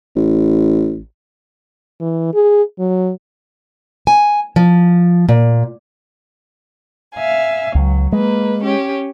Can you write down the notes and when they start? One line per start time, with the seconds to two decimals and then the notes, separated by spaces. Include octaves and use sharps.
0.16 A1
2.00 E3
2.34 G#4
2.79 F#3
4.07 G#5
4.56 F3
5.29 A#2
7.14 E5 F5 G#5
7.75 C#2 F#3
8.12 G#3 A#3 B4
8.62 C#4 G4 C#5